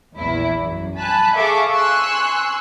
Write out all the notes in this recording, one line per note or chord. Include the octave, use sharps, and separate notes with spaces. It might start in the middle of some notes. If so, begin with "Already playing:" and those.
A#1 E2 E4
F#2
G#5 A5 B5 F#6
G#4 A4 E5 F5 C#6 D6
G#5 C6 C#6 E6 F#6